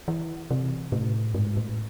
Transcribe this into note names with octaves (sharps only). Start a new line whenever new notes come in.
E3
C3
A2
G#2
A2